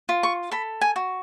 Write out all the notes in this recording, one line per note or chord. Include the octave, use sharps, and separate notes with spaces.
F4
C#6
A4 B5
G#5
F#4